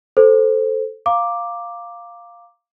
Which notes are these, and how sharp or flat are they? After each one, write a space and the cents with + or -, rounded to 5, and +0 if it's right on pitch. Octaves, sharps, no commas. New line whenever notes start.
A4 +0 C5 +0
F5 +0 A#5 +0 D6 +0